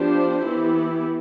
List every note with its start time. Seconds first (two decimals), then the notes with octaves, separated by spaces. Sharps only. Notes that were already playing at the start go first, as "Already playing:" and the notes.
Already playing: F3 B3 D4 G4 C5
0.46 E3 B3 E4 G4